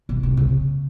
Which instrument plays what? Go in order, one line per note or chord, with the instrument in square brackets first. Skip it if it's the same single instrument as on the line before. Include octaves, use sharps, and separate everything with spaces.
[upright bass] B2
C3
C#3